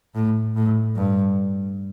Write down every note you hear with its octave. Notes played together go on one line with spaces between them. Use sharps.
A2
A2
G2